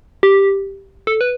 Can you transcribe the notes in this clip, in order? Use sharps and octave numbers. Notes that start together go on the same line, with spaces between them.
G4
A4
B4